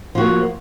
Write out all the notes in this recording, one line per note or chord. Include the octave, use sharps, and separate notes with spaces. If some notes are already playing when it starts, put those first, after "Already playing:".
F3 A#3 F#4